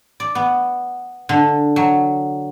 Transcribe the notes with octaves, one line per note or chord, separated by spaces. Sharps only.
D5
B3
D3
F#3